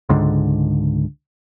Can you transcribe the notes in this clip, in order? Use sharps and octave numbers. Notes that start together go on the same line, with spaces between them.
C#2 G#2 D3